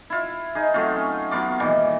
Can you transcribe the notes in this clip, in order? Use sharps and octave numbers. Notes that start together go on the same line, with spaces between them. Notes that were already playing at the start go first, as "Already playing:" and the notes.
E4 F4
D#4 G#4
F#3 A3 C4 F4
C#4
F#3 B3 F4 D6
A#2 D#3 E3 G3